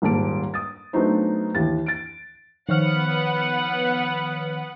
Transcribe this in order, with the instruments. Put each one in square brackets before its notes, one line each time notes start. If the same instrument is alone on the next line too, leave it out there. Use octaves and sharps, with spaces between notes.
[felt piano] D#1 G#2 A#3 A5 D7
D#6 A6
F#3 A3 B3 D4 D#4 C5
D#2 E3 A6
A6 D7
[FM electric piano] D#3 C#5 F6 [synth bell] F3 [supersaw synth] B3 B4 [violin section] F#5